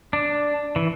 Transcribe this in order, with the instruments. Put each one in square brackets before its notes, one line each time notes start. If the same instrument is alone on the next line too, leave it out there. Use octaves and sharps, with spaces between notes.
[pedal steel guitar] D4
E3